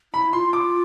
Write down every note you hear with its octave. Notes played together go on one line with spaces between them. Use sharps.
E4 B5
F4 C6
D6